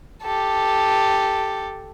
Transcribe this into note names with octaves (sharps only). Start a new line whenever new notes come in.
G4 A4